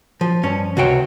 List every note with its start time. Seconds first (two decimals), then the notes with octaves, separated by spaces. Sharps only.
0.21 F3
0.43 G2 C#4
0.77 C#2 C3 F#4 C5 C#5 G5